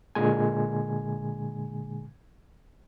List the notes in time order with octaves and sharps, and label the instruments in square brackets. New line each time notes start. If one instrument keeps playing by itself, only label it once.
[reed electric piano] A#2 D3 G#3 G#5